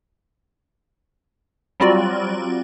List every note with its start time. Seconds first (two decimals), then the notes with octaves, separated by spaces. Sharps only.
1.80 F#3 G3 C4 F4 F#4 D5